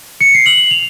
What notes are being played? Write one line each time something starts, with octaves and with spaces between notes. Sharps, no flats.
C#7
C7
F#7
F7